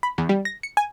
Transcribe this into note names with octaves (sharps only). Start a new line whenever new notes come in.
B5
E2
G3
A#6
C#7
G#5